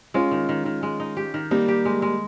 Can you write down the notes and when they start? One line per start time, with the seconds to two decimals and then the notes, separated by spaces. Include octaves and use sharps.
0.14 G#3 C#4 F4
0.31 D#3
0.49 D#3
0.66 D#3
0.83 G#3
1.00 D#4
1.17 G4
1.34 D#3
1.51 G3 A#3 D#4
1.68 G4
1.85 G#3
2.02 G#3